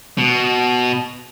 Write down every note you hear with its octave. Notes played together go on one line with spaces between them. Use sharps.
B2